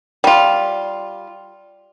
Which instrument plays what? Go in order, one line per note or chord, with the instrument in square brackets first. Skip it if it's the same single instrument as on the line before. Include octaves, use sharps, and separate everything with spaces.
[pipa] G3 F4